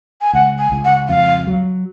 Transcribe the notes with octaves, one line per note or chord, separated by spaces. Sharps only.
G#5
C#2 F#5
G#5
C#2
F#5
F2 F5
F#3